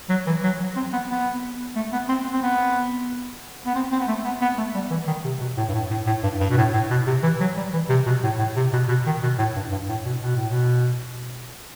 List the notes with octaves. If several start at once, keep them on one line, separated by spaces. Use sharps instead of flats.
F#3
E3
F#3
F#3
C4
B3
B3
A3
B3
C4
C4
B3
B3
C4
C4
B3
A3
B3
B3
A3
G3
E3
D#3
C3
B2
A2
G2
A2
A2
A2
G2
G2
B2
A2
A2
B2
C3
E3
F#3
G3
E3
C3
B2
A2
A2
C3
B2
B2
D#3
B2
A2
G2
G2
A2
B2
B2
A2
B2